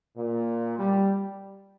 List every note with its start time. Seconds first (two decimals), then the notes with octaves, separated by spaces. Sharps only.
0.16 A#2
0.77 G3